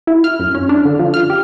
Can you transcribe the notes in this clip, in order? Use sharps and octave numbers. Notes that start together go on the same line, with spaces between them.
E4
F6
F#2
C#4
D4
D3
F3
F6
G4